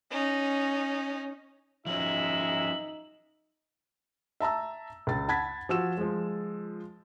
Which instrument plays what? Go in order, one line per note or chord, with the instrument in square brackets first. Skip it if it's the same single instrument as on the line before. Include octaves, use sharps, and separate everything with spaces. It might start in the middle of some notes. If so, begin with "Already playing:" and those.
[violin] C#4 D#4
[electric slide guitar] F3 F#3 C#4 [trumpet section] G#3 E5 [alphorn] D#4 [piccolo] F#7
[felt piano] E5 A5 A#5 E6
C#2 A6
F#5 A5 B5 G#6 A6 B6
F3 F#4 E6 E7
F3 G#3